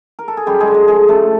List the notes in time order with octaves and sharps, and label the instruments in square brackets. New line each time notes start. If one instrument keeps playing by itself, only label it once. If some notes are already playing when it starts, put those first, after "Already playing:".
[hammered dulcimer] A#4
A4
G#4
F#2 G3 G4
G#3 G#4
D3
G#3 G#4
F3 G#3 G#4
F#2 A3 A4